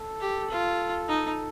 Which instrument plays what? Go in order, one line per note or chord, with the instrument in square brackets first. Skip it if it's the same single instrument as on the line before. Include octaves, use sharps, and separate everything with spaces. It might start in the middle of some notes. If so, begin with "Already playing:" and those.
Already playing: [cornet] A4
[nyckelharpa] G4
F4
D#4